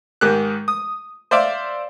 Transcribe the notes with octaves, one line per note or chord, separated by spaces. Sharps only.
G#2 D#3 G4 F#6
D#6
C5 D5 E5 F5 D6